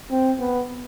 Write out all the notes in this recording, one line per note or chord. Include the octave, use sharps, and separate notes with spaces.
C4
B3